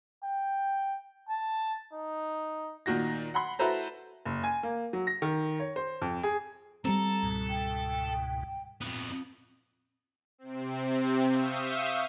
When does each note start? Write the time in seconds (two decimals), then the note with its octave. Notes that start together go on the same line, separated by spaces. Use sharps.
0.24 G5
1.29 A5
1.93 D#4
2.86 A#2 D#3 F#4 A#6
3.34 F#5 B5 C6
3.59 E4 F#4 A4 B4 C5 A#5
4.25 F#1
4.44 G#5
4.63 A#3
4.93 F#3
5.07 A#6
5.22 D#3
5.60 C#5
5.76 C5
6.02 F2
6.23 G#4
6.85 G3 A3 C4 A4 A#5
7.23 C#2 G#2 B2
7.50 G5
8.81 F2 A#2 B3
10.38 C3 C4
11.28 E5 F5 C#6 D#6 E6 G6